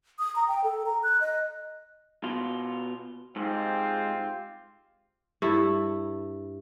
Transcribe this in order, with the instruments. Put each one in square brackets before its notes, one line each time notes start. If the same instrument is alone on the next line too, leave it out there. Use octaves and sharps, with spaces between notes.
[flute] D#6
A#5
G5
A4
A#5
F#6
D#5
[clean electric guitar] B2 F4
[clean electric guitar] G#2 [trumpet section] C4 F4 G4
[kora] G2 E4 A4